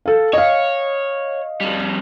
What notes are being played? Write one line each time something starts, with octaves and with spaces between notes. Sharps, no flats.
A4 F5
C#5 D#5 F5
F2 G3